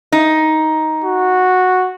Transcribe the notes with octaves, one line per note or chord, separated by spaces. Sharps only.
D#4
F#4